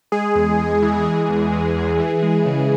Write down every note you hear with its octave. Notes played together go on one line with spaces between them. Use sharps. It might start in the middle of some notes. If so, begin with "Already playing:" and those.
G#3 G#4
E2
E2
E3
G#3 G#4
E2
G#3
E2
E3
G#3
C#3